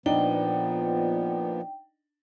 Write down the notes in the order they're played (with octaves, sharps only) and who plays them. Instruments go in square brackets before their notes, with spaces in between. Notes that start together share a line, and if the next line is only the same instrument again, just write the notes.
[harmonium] A#2 F3 B3 [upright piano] D4 D#4 [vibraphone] G5